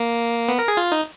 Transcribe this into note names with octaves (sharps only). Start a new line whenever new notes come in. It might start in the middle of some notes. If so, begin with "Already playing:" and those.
Already playing: A#3
B3
A#4
G#4
F4
D#4